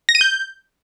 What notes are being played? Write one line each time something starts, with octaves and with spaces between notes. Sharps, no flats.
A#6
D#7
G6